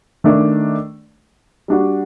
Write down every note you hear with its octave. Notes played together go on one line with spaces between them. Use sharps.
D#3 A3 D4
G3 D4 F#4